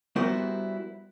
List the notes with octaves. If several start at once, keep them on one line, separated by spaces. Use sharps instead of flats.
G3 B3 E4 F#4 A#4 C5